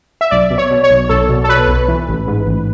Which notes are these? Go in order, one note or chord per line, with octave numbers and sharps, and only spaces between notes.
E5
B1 D5
B2
C#5
B2
C#5
B1
B1 A4
B2
A4
B2 B4
B1
E3
A1
G#2
A1